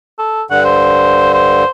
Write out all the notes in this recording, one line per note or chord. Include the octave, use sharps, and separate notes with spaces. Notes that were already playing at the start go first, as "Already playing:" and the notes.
A4
G2 D3 F#5
C5
C5